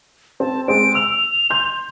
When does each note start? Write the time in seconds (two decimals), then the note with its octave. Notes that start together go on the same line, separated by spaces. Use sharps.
0.40 C4 A5
0.68 G#3 C4 D7
0.95 E6 F7
1.50 C6 G6